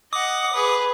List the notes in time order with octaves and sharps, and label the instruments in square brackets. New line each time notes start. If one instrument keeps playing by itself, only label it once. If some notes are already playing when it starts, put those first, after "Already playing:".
[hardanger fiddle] D#5 F#5 [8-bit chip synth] D6 D#6
[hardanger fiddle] G#4 B4